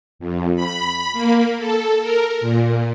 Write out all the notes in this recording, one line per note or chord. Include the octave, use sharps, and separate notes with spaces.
F2
B5
A#3
A4
A#4
A#2